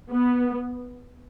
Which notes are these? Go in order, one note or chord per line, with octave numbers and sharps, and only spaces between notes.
B3